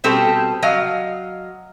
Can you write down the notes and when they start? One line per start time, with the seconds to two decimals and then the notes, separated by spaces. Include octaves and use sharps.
0.04 B2 G3 C4 G4 A4
0.62 F#3 D#5 F5